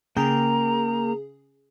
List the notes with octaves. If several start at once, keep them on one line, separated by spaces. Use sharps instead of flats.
C#3 A#3 G#4 A#4 G5 A#5